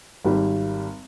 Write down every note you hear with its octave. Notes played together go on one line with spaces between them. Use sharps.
G#1 G3